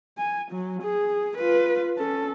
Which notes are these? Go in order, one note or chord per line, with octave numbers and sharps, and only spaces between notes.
G#5
F#3
G#4
F4 B4
C#4 A4